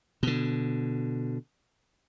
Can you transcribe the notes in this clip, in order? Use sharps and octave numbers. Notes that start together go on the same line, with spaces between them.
B2 D3